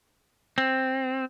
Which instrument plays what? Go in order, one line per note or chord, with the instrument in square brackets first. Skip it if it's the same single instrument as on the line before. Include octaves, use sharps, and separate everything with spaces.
[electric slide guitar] C4